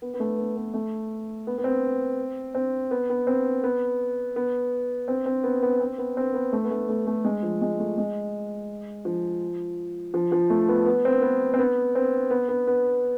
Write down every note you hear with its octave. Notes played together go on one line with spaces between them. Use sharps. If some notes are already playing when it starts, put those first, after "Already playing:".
B3
B3
A3
B3
B3
A3
B3
B3
C4
C4
B3
B3
C4
B3
B3
C4
C4
B3
B3
C4
B3
C4
B3
A3
B3
A3
A3
A3
G#3
F3
G#3
A3
G#3
F3
F3
F3
A3
B3
B3
C4
B3
C4
B3
C4
B3
B3
B3